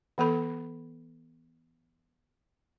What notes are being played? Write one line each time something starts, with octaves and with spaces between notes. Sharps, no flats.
E3 B3 A4 B5